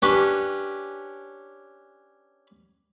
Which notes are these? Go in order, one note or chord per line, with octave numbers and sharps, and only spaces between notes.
C#4 D4 G4 B4 C#5